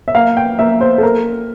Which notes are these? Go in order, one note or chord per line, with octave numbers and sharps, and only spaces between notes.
E5
A#3 F5
G5
A#3 E5
C5
A4
A#3 A#4